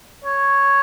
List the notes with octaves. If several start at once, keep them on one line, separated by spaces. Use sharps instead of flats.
C#5